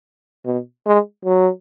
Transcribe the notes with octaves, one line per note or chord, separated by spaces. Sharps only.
B2
G#3
F#3